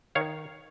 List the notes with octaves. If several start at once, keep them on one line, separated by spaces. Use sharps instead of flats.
D#3 C#5 F5